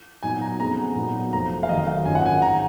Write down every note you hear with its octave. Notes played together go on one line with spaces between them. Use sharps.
A#2 F#3 B3 D#4 G#5
A#5
F2 C#3 G#3 B3 A#5
A#2 F#3 B3 D#4
F1 F2 F3 A#5
F5
F1 D#2 D#3 F#3 D#5
F5
G#1 F#2 D#3 A#3 F4 G#5
F#5
G#5
G#1 D#3 A#5